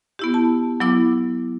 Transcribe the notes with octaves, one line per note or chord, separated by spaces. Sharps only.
B3 E4 G4
A5
F#3 B3 E4 D6